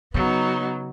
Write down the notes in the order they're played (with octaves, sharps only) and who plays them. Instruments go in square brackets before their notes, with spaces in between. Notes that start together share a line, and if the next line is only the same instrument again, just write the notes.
[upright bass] C#3 [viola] F#3 [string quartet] B3 D#4